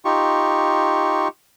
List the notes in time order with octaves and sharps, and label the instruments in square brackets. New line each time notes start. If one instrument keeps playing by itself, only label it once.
[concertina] D#4 F4 G4 C#6